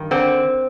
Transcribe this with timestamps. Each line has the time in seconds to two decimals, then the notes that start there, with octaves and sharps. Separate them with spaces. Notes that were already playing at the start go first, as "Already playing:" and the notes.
Already playing: G2 D#3
0.11 D3 C4